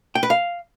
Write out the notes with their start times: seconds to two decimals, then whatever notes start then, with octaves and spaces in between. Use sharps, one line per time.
0.15 G5
0.23 B4
0.30 F5